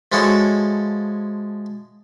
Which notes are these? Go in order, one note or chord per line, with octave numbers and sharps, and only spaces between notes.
F3 G#3 E4 F#4 A4 C#5